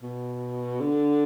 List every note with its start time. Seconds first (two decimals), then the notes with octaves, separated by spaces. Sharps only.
0.03 B2
0.80 D3